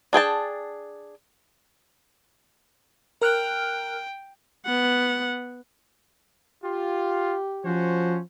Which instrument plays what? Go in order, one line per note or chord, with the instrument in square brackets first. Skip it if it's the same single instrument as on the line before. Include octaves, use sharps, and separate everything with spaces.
[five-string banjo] D4 G#4 G5 A5
[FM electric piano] A#4 F6 F#6 [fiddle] G5
[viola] B3 F#5
[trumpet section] F4 [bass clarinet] G4
[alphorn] F3 [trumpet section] C#4 F#4 C5